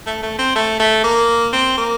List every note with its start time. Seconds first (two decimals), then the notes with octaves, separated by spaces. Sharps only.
0.07 A3
0.23 A3
0.38 C4
0.55 A3
0.80 A3
1.04 A#3
1.53 C4
1.77 A#3